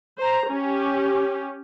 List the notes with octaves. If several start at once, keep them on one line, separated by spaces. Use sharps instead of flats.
C5 A#5
C#4 G4